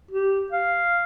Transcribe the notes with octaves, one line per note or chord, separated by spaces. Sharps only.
G4
F5